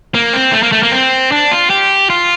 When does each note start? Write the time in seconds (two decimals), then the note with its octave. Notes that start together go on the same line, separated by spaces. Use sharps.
0.14 A#3
0.33 C4
0.53 A3
0.63 A#3
0.72 A3
0.83 A#3
0.92 C4
1.32 D4
1.52 F4
1.70 G4
2.10 F4